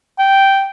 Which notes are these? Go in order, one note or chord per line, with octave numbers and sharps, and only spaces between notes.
G5